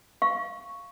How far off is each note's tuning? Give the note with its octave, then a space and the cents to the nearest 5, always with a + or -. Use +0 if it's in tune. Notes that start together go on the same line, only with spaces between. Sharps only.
F5 +0 C#6 +0